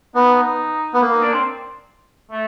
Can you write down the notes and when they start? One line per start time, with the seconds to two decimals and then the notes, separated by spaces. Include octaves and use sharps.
0.15 B3 D#4
0.93 B3
1.01 A#3
1.12 D#4
1.22 D4
1.33 C4
2.31 A3